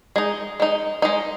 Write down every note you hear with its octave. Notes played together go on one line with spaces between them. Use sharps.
G#3 D#4
G#3 D#4
G#3 D#4